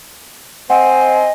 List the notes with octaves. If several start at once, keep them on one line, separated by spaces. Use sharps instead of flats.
C4 C5 D#5 F#5 G#5